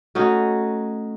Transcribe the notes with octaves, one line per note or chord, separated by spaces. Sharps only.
A3 C#4 D#4 F#4